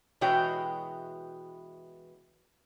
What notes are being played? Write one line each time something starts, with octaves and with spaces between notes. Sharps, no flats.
B2 E3 G#3 F#4 C#5 G5